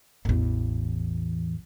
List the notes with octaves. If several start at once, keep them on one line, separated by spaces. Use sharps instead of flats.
A1 E2